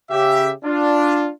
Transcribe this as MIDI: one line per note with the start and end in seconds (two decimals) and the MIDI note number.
0.10 0.51 49
0.10 0.51 67
0.10 0.51 76
0.65 1.30 62
0.65 1.30 65